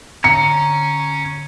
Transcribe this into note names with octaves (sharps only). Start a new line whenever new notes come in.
D3 C#4 A#5 C#7